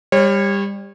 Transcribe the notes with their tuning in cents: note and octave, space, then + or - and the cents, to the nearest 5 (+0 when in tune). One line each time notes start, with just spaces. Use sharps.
G3 +25 C#5 -25